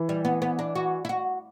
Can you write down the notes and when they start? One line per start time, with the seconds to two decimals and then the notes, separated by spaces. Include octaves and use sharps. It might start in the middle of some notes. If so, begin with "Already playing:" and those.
Already playing: E3
0.09 G3
0.25 B3
0.42 B3
0.59 D4
0.75 F#4
1.05 E4
1.09 F#4